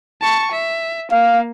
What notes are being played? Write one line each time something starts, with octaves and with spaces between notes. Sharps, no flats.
A5 C#6
E5
A#3 F5